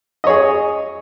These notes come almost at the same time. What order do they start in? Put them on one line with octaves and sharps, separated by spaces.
D#5 C#5 G#4